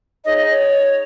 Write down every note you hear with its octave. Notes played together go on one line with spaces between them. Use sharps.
D#4 G#4 C#5 D#5
D#5
C#5